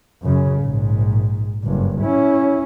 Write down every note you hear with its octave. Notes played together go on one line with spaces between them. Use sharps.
F#2 C#3
A#1 G#2
F#1 G2
C#4 E4